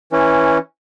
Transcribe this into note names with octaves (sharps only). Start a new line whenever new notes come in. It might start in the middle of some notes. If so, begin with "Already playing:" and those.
E3 C#4